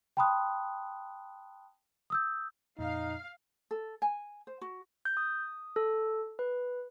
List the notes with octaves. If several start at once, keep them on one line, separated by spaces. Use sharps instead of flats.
G5 A5 B5 C6 D#6 F#6
D#6 E6 G6
F2 A#2 D#4 F5
A4
G#5
C5
F#4
G6
D#6
A4
B4